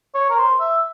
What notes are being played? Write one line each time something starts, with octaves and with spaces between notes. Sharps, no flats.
C#5
A#4
C5
E5